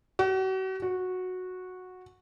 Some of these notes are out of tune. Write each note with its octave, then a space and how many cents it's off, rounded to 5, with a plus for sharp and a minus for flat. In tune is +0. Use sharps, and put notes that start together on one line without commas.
F#4 +40
F#4 -10